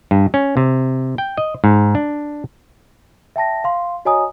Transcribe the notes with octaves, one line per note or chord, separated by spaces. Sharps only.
G2
C#4
C3
G5
D#5
G#2
D4
E5 G5 A5 A#6
F5 C6
F#4 C#5 D#5 G#5 A#5 D#6